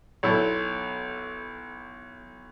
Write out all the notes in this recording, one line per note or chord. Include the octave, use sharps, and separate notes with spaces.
B1 E4 A4